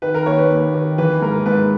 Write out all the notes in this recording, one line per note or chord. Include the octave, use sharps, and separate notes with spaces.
D#3 B4
A#4
D#2 C#5
B4
D#2
D#3
E3 B4
G#2 A#4
G#2 B4